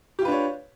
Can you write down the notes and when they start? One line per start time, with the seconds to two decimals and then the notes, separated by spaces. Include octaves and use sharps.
0.19 G4
0.22 F4
0.25 B4
0.28 D4
0.31 C#5